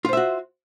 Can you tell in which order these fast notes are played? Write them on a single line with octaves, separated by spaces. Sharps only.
F4 C5 E5 F#4